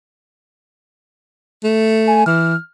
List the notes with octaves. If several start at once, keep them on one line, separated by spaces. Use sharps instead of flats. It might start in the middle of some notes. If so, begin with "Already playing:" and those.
A3
G#5
E3 F6